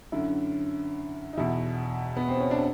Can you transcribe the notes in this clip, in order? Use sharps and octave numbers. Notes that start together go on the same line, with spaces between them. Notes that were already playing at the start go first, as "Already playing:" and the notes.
F#2 D3 E4
D#4
E2 B2 E4
B3
C4
C#4
D4